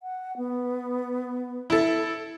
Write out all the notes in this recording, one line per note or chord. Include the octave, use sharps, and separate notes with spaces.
F#5
B3
E4 A4